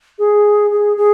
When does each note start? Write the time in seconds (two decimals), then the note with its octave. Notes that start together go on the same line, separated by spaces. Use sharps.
0.19 G#4
0.71 G#4
0.97 G#4